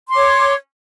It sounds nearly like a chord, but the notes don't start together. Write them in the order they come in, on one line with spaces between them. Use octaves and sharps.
C6 D6 C#5